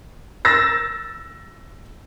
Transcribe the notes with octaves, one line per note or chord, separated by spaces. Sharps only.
E6 A6 A#6